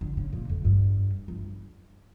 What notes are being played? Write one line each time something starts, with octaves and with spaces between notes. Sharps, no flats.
D3
C#3
A#2
F2
G2
G2